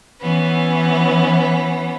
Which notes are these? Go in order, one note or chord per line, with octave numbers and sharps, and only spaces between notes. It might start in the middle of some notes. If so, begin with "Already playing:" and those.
E3 B3 C#4